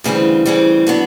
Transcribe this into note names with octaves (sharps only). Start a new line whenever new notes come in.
D2 C#3 E3 G3 C4
D2 C#3 E3 G3 C4
D3 F#3 B3 D4